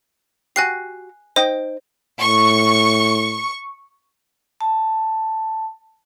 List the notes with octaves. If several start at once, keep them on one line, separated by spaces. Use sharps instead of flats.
F#4 G4 G#5 F#6 C7
D#4 C5 D#5 G5
A2 C#6
A5